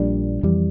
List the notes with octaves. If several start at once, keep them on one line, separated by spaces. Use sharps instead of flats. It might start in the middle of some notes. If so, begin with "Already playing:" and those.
Already playing: A#1 A#2 G3 D4
F2 E3 G3